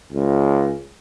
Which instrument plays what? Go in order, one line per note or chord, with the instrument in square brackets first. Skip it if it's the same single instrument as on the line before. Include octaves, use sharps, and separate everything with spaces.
[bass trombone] C#2